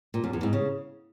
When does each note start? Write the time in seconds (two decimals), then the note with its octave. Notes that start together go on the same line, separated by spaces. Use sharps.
0.14 A#2
0.24 F#2
0.33 E2
0.43 G#2
0.53 C#3